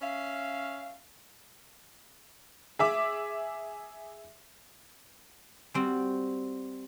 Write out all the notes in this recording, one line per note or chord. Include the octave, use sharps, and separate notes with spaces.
C#4 C#5 E5 F5
G#4 E5 D6
G3 C4 F#4